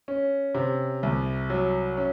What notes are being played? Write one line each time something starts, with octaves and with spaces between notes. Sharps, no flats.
C#4
C3
C2
F#3
C#4